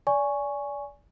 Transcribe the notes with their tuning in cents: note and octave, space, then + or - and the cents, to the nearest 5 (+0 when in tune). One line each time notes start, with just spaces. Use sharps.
D5 -25 G#5 +0 C#6 +0